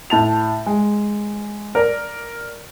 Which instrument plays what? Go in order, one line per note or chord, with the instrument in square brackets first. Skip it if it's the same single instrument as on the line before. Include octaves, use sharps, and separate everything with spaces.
[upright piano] A2 A5 F7
G#3
A#4 D5